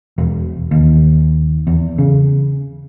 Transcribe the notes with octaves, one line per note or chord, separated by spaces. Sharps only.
E1
D#2
E2
C#3